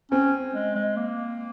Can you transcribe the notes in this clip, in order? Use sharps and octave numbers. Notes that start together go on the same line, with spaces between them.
C4 C#4
G#3
G#3
A#3